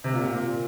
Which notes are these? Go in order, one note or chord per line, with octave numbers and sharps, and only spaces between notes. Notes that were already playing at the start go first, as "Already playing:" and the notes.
C3
A#2
A#2